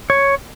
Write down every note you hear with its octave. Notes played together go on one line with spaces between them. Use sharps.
C#5